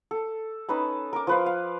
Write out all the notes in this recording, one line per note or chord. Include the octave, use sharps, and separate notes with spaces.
A4
C#4 D#4 B4 A5
A#4 D6
F3 B4 F5
F5